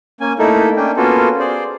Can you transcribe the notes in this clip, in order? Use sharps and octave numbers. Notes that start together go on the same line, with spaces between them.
A#3 C#4 G#5
A3 A#3 D#4 E4 A4
A#3 C#4 D4 G5
A#3 B3 C#4 F4 F#4 A4
G#4 C5 D5